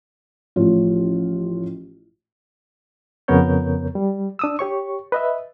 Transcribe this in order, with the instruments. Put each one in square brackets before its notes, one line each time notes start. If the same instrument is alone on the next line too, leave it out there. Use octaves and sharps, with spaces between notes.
[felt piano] A1 A2 F3 F4 C#5
[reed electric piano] F2 C#3 B3 A#4 C#5 G6
G3
D4 D#6 E6
G4 C#5 C#6
B4 D#5 E5